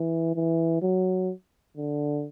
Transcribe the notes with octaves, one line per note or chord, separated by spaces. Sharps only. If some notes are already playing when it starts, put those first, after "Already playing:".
Already playing: E3
E3
F#3
D3